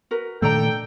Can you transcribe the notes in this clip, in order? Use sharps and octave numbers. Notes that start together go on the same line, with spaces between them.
F#4 A#4 B4
A#2 D#3 A3 D4 A4 D5 G5 A#5